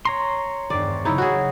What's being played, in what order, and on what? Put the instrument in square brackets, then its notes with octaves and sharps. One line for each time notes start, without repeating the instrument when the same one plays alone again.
[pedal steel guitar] C#5 A#5 C6
[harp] G#1 E2 G2 [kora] D5
[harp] C#3 F#3 [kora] D#4 E4
[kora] F#4 G#4 [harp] E6 G6